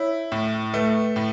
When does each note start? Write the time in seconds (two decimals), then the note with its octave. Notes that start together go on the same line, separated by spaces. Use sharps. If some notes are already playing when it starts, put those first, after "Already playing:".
Already playing: E4 C#5
0.32 A2
0.74 A3 B4
1.16 A2